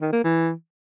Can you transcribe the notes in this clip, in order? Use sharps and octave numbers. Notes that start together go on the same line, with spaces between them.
D#3
A#3
E3